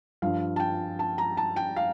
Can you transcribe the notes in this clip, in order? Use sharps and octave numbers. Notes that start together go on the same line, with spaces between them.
G2 F3 F5
A5
G5
A5
A#5
A5
G5
F5